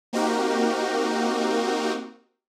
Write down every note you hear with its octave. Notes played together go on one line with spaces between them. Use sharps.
A#3 C4 D#4 F#4 G4 A#4